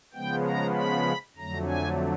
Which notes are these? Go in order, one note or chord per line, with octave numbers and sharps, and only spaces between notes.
C#3 F3 G#3 B3 G5
A#5
B5
F2 D3 F#3 A3 A#5
G#5